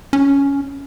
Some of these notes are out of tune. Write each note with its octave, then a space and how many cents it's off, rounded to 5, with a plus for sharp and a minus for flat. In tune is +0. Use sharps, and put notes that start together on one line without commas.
C#4 +10